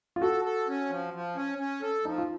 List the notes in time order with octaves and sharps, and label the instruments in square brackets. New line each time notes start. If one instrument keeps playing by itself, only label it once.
[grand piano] F4
[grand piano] F#4 [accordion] A4
[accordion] A4
C#4
F3
F3
C#4
C#4
A4
[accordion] F3 [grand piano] D#4
[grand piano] F4